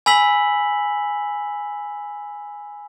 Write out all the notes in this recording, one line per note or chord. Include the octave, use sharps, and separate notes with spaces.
G#5 B5 E6 B6 F#7